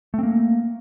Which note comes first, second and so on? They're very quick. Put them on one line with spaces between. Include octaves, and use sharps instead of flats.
A3 C4 A#3